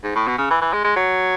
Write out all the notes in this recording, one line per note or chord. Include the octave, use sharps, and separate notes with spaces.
G#2
A2
B2
C#3
E3
E3
G#3
G#3
F#3